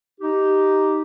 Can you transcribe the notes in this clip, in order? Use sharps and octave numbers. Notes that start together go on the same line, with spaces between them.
D#4 G4